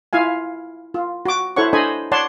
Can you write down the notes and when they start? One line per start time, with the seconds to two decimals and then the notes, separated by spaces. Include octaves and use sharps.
0.13 E4 F4 F5 G#5
0.94 F4
1.26 F#4 D6
1.56 E4 A4 C5 C#5 F#5 C#6
1.73 D4 A4 C5 D#5 G#5 B5
2.12 C#5 D5 F#5 A5 C6